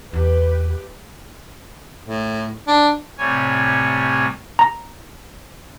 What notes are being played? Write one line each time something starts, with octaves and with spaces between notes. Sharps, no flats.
E2 G4 B4
A2
D4
A2 C3 G3 C#5 G#5
A#5